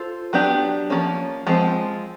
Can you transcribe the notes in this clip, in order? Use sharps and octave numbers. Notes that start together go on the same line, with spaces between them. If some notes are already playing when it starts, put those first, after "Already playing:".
Already playing: F4 A4 C5
F#3 B3 D4 G4
F3 A#3 C#4
F3 G#3 C4